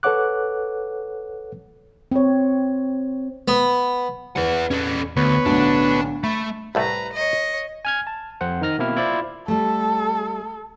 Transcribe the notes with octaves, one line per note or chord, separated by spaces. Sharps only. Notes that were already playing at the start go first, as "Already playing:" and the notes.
A4 B4 C#5 F#5 D6 F#6
C4 C#5
B3
E2 E4 B4 F#5
C#4 A4
D2 B3 B4 C#5
B1 A2 D3 D4
A3 B5
C2 A2 A3 B4 A#5
C#5 D#5
G#5 F6 G#6
A5
F2 C4 C5 F#5
D#3 D#4 F6 A#6
B2 A#3 C4 E4 F6
E4 F4 C5 D5
G3 A3 A4